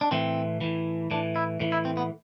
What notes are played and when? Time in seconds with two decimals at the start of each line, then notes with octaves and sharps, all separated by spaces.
0.01 D4
0.11 A2 E3 C4
0.61 A2 E3
1.11 A2 E3 D4
1.36 E4
1.60 A2 E3
1.72 E4
1.85 C4
1.97 B3